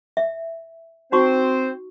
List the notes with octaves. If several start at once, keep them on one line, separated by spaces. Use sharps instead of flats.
E5
C4 D#4 F#4 C5 C#6